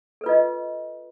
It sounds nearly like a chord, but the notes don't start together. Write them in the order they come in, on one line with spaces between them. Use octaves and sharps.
A4 B4 F4 D#5